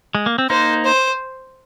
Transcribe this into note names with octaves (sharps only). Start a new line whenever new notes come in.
G#3
A#3
C4
A#3 D#4 C5
C5